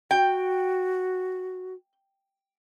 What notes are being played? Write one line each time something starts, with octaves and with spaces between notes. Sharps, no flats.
F#4 G5